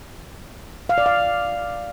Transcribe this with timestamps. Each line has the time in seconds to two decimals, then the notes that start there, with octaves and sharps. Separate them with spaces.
0.89 F5
0.98 D5
1.06 F5